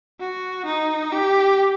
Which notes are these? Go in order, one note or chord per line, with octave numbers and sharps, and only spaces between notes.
F#4
D#4
G4